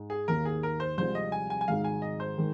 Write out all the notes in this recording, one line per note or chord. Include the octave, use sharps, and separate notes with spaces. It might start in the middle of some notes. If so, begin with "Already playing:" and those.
Already playing: G#2 G#3 D#4
G#4
D#2 D#3 A#3 A#4
G#4
A#4
C5
C2 C3 F3 G#3 C4 C5
D#5
G#5
G#5
G#5
G#1 G#2 G#3 F5
G#5
D#5
C5
D#3 G#3